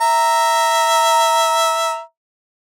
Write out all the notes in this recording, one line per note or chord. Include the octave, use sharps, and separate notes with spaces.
E5 A#5